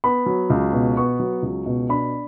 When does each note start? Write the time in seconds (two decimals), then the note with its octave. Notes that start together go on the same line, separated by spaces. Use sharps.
0.04 B3 B5
0.26 F#3
0.50 C#2
0.73 B2
0.97 B3 C#6
1.20 F#3
1.43 C#2
1.66 B2
1.89 D4 B5